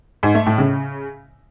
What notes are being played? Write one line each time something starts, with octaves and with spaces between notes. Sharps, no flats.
G#2
A3
A2
C#3